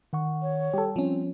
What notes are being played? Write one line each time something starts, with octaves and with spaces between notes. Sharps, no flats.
D#3 F#5 C#6
C#5
G3 G4 A4
F3 C4 C#4